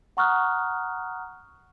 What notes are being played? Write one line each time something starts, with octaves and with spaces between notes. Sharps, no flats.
F#5 A#5 C#6 D#6 F6 F#6